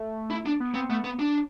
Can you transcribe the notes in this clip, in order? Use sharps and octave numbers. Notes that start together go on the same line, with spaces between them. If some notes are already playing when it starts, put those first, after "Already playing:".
Already playing: A3
E4
D4
B3
B3 C4
A3 B3
B3
D4